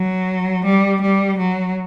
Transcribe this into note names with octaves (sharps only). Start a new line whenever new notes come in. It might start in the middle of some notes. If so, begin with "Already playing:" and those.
Already playing: F#3
G3
G3
F#3